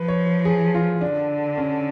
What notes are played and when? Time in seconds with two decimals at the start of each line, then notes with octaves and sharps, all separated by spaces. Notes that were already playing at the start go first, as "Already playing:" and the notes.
Already playing: F3 B4
0.08 C#5
0.45 G#4
0.74 F4
1.01 D3 D4
1.58 C#4